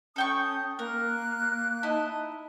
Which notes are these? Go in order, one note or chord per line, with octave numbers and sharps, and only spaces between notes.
C#4 A4 G5 C#6 D#6
A#3 A#4 F#6
D#4 E4 D#5 A5